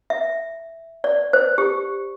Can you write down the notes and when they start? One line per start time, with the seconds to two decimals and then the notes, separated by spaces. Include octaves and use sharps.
0.10 E5
1.04 D5
1.33 C5
1.58 G4